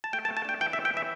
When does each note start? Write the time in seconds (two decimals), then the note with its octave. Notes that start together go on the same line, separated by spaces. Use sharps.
0.04 A5
0.13 A3 G5
0.25 A5
0.29 A3
0.37 A5
0.45 D4 G5
0.60 E3 G5
0.73 E5
0.77 E3
0.85 G5
0.94 E3 E5